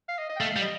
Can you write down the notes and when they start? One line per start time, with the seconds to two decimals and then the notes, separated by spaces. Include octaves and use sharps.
0.09 F5
0.19 D#5
0.30 D#5
0.36 G5
0.40 A3 F5
0.51 F5
0.56 G3
0.62 D#5